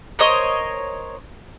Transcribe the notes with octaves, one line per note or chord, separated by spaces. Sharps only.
A#4 C5 C#5 D#5